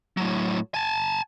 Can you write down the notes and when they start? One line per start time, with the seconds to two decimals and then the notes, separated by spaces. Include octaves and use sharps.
0.17 A2 F#3
0.74 G#5 A5